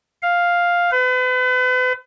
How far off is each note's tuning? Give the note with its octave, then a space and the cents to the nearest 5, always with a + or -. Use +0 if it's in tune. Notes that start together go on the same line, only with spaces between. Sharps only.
F5 +5
B4 +40